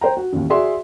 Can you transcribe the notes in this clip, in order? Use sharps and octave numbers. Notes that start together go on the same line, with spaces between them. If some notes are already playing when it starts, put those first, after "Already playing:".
C5 G5 A#5
F#4
A1 D#2
F#4 G#4 D5 E5 C6